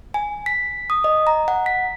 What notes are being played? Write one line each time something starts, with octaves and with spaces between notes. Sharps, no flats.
G#5
B6
D#6
D#5
A#5
F#5
B6